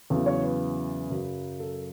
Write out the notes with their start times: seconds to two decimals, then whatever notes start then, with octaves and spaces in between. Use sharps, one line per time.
0.10 E2 C#3 F#3 A4
0.26 C#5
0.43 B4
1.10 F#2 C#3 F#3
1.60 A4